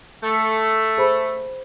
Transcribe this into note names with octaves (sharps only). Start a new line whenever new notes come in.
A3
G#4 C5 B5